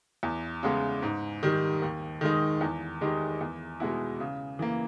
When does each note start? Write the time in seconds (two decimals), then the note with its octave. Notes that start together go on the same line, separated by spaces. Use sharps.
0.23 E2
0.63 C#3 G#3 B3
1.02 G#2
1.43 D#3 G3
1.82 D#2
2.21 D#3 G#3 D#4
2.61 E2
3.01 D#3 G#3 D#4 G4
3.41 E2
3.80 B2 G#3 B3 E4
4.20 C#3
4.59 E3 A#3